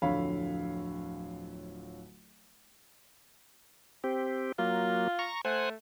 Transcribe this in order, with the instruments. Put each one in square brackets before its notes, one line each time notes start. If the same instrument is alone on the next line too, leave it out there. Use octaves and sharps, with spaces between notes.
[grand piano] D1 F2 D3 C#5 F5 B5
[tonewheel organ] C4 G4
[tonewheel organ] F#3 A#3 [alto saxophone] F4
[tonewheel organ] A#5 C#6
[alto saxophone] A3 [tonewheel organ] C5 F#5 G#5